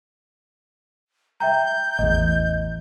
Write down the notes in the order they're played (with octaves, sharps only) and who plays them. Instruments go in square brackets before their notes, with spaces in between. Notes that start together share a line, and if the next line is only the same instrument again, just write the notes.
[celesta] E5 G5 A#5 [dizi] G6
[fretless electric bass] A1 E2 [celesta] D#5